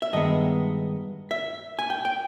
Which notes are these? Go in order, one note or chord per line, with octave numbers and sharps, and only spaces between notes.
E5
G2 D#3 G#3 B3 D#5
E5
G#5
G5
G5